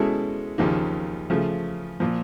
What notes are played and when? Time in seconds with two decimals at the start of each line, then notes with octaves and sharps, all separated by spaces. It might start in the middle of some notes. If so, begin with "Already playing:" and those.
Already playing: B2 G#3 C#4 E4 A4
0.58 D#2 C#3 F3 A#3 D#4
1.30 C#3 F3 A3
2.00 A#2 F3